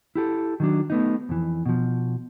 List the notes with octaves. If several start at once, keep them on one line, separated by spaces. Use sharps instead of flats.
E4 G4 A4
D#3 F#3 D4
A3 B3 D#4
F2 E3
B2 F3